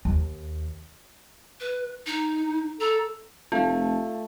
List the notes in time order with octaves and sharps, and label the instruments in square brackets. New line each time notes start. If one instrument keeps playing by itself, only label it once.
[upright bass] D#2
[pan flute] B4
D#4
[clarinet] A4 [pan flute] A#5
[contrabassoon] F1 [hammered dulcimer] A3 [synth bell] F4 [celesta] F5 A5